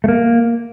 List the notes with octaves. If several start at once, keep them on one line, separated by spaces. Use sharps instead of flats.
A3
A#3